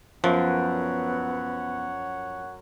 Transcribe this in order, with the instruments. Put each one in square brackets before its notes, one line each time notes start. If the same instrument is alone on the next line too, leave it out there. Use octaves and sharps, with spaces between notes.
[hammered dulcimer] F#2 [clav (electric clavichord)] F3 [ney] B3 [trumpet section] C#5 F#5